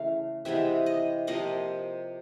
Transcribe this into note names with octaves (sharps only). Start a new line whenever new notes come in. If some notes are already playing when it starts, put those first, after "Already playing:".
Already playing: C#3 E3 A3 F5
C3 E3 G#3 B3 E5
D#5
C3 F3 A#3 D#5